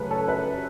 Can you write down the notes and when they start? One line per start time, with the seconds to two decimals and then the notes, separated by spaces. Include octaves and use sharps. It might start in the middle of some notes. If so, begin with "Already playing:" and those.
Already playing: F#2 C#3 A3 C#4 B4
0.11 A4 C#5
0.28 B4 E5